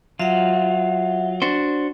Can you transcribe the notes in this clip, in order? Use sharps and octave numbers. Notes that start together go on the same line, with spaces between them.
F#3 F4 E5 F#5
D4 F#4 C5